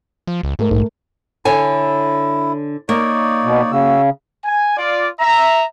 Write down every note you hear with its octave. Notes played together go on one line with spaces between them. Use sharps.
F3
C#2
G#2 A3 A#4
A#1 G#2
D3 E4 C#5 G#5
A#3 D#4 C#5 D5
B2
C#3 F#4 E6
G#5
F4 D5
E5 A#5